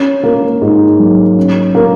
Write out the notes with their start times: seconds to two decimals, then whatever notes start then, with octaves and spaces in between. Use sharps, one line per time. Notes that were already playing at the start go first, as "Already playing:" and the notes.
Already playing: C#4
0.23 A#3
0.62 G#2
0.99 F#3
1.37 C#4
1.75 A#3